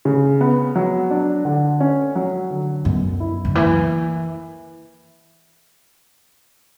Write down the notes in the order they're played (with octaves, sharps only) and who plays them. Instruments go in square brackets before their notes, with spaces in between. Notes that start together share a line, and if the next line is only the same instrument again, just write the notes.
[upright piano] C#3
B3
F#3
D4
D3
C#4
F#3
D3
[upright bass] F#2 [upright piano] B2
[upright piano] E4
[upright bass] D3
[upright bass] E3 [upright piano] A#3